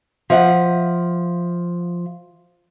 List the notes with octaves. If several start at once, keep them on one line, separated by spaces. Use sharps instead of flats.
F3 E5 F#5